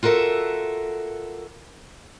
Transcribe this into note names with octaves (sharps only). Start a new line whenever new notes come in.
F4 F#4 A4 A#4 E5